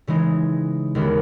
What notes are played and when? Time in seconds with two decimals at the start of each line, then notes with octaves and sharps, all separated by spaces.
0.07 C#3 E3 G#3 D#4
0.95 D#2 C#3 G#3 B3